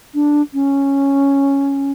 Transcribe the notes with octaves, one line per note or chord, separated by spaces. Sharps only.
D4
C#4